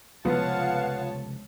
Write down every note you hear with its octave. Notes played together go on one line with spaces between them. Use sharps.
F1 C#2 F3 B3 C#5 F5 F#5 A5